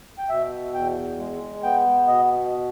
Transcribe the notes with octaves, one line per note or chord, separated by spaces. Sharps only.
G5
B2 E5
E2 G5
G#3
B3 G5
B2 D#5